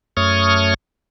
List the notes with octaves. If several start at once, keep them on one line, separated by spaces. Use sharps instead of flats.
F#2 A3 C#5 C#6 D#6 F6